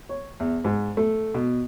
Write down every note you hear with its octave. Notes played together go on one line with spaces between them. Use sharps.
C#5
E2
G#2
A3
B2